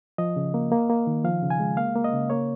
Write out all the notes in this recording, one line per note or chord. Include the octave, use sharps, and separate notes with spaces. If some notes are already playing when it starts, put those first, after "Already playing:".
F3 D#5
C#3
A#3
A#3
A#3
D#3
F3 F5
C#3
G#5
G#3
A#3 F5
A#3
D#5
C#3
A#3 C#5